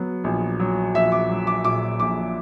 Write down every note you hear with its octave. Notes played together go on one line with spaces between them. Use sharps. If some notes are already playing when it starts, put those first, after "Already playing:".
Already playing: F#3 B3
A#1
F#3
A#1 E5
D6
F#3
D6
A#2 D6
A#1 D6